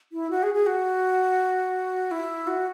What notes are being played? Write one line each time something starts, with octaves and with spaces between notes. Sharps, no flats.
E4
F#4
G#4
G#4
F#4
E4
F#4